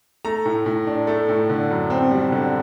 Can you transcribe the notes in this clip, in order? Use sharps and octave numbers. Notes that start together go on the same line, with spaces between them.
A3 A#5
A2
A2
D4
A3
A2
D3
F#2
C4
G3
D3